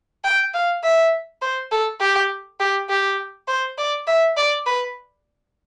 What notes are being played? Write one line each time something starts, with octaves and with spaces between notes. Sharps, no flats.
G5
F5
E5
C5
A4
G4
G4
G4
C5
D5
E5
D5
B4